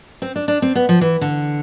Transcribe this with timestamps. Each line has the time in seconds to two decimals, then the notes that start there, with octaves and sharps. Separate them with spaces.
0.22 C4
0.36 D4
0.48 D4
0.62 C4
0.75 B3
0.89 F3
1.01 E3
1.21 D3